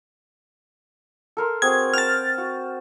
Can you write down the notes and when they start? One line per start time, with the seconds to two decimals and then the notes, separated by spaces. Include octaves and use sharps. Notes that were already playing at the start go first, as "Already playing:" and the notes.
1.37 A4 A#4 C6
1.62 C4 F#4 G#4 G#6
1.94 G5 A5 F6 A6
2.38 F#4